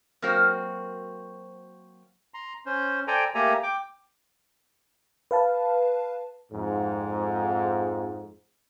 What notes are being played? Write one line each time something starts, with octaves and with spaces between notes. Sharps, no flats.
F#3 A#3 C4 F#4 A#4 C5
A#5 C6
C#4 C5
A4 C5 D5 G5 G#5 A#5
A3 A#3 G4 A4 G#5 A#5
G5 D6
B4 F5 A5
F2 G#2